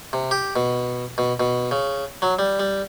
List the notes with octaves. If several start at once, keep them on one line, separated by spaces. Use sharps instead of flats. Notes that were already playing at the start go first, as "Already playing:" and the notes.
C3
G4
B2
B2
B2
C#3
F#3
G3
G3